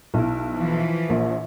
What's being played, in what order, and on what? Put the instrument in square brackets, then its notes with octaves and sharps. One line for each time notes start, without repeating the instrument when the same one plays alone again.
[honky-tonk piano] B1 E4
[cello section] E3 F3
[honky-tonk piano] A#1 A#2